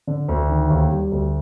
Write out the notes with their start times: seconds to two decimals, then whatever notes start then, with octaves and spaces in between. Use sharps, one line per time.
0.07 D3
0.28 D2
0.49 D#3
0.70 D#2
0.91 G3
1.12 D2